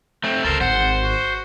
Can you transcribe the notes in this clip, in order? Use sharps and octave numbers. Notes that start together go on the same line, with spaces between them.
A3 C4
C#2 C#3 A4 A#4 C5
G#1 C5 F#5
F#4